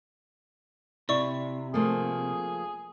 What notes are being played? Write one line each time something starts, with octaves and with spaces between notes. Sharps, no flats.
C3 E4 D5 C#6
F3 A3 A#3 G#4